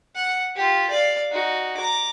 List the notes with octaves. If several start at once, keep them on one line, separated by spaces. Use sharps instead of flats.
F#5
F4 G4
D5 F5
D#4 F#4
A#5 D6